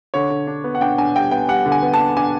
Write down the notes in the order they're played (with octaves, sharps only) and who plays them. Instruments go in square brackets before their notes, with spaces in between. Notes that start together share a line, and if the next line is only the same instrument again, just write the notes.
[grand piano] D3 C#5
D3
D4
B3
F#5
D4 G5
D4 G#5
G3 G5
B3 G5
G3 F#5
D3
G#5
B3
A5
D4
D4 G#5